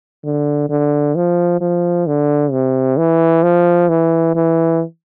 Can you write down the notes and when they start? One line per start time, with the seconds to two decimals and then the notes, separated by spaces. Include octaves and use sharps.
0.24 D3
0.70 D3
1.16 F3
1.61 F3
2.07 D3
2.52 C3
2.97 E3
3.43 F3
3.89 E3
4.35 E3